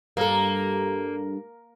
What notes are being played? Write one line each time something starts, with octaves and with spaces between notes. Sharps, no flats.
G2 A#3 A4